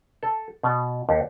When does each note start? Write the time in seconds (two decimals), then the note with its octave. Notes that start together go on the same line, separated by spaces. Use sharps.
0.23 A4
0.63 B2
1.09 D#2